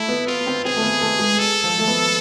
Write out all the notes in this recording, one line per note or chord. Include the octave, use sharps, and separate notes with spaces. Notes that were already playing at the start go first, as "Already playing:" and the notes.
Already playing: A3 E4
B3
B3 F4
C4
C4 G#4
A3
B3
A3
G#3
A4
F3
A3
B3